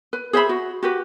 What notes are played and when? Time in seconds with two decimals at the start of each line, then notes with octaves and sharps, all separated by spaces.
0.13 B4
0.33 G#4 C5 E5 B5
0.49 F#4
0.83 F#4 G4 B4